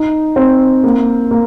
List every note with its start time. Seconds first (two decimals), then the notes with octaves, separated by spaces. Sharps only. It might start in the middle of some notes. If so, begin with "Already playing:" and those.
Already playing: D#4
0.36 C4
0.84 A#3
1.31 A#3